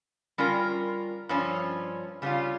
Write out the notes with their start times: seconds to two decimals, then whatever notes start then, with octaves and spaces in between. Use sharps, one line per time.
0.38 G3 C#4 F4 A#4
1.29 G2 F3 C#4
2.22 C#3 G3 C#4 F4